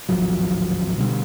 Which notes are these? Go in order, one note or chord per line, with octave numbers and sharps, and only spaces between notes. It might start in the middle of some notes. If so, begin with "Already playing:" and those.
D1 G#1 F3 F#3
B2 D3 G3